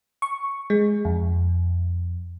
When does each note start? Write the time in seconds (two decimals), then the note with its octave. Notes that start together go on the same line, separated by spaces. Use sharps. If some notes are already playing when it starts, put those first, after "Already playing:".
0.22 C#6
0.70 G#3
1.05 F2